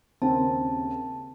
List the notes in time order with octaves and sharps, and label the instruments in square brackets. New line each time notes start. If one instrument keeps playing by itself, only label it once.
[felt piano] D#2 C#3 [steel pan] C4 [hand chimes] A5